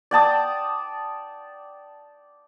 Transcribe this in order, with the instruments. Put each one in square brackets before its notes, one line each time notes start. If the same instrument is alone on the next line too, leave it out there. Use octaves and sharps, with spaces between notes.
[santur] D5 G5 A5 D#6